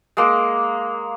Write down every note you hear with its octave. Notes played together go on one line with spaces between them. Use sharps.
G#3 A#3